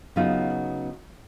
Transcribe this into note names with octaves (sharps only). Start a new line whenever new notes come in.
C#3 F#3 B3 D#4 F4